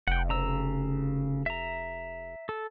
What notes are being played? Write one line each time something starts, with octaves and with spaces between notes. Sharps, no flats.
F1 F#5 G5
C#3 A#5 E6
E5 A#5
A4